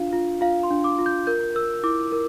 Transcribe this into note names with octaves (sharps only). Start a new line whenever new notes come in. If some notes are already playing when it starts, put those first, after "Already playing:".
Already playing: D4 F4 F5
F4
F4 F5
C6
D4
D6
F4
G6
A#4 G6
A#4 E6
E4 D6
A#4